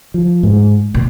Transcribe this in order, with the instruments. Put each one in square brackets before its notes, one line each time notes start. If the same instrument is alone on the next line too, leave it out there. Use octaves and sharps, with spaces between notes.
[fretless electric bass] F3
G#2
[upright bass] A#2